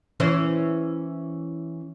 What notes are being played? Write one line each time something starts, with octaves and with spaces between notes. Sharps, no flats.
E3 C#4 C5